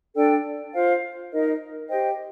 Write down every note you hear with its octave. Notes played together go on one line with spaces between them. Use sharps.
D4 A4 D5 G5
F4 C5 F5
D#4 A#4 D#5
G4 C5 D#5 G5